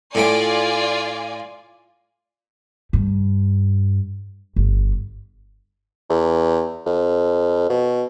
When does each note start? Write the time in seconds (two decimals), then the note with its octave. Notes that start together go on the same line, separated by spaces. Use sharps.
0.15 A2 A3 F4 D5 G#5 D6
2.93 G2
4.56 G1
6.10 E2
6.87 F2
7.70 B2